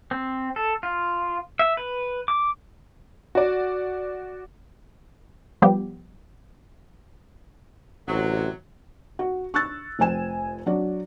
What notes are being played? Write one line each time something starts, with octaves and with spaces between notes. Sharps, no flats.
C4
A4
F4
E5
B4
D6
F#4 D5
F3 G3 B3 G4
A1 C3 F#3
F#4
C#6 E6 F#6 A6
F1 F3 C4 F4 G#5 E7
F#3 D4 F#4 D5